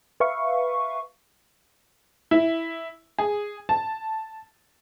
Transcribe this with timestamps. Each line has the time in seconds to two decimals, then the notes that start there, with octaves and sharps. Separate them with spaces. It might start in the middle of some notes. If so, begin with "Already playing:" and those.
0.20 B4 E5 F5 C#6
2.31 E4
3.19 G#4
3.69 A5